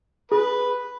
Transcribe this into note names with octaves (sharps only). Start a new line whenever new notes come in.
G#4 B4